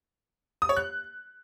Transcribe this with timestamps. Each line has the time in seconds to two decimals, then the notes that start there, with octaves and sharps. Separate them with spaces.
0.62 D#6
0.69 C#5
0.77 F#6